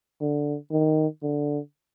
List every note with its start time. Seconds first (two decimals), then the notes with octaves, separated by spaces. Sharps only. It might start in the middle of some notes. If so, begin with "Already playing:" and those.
0.21 D3
0.71 D#3
1.23 D3